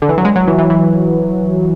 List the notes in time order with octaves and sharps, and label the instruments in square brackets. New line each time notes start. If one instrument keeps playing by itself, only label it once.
[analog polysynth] D3
E3
F#3
G#3
F#3
E3
E3
E3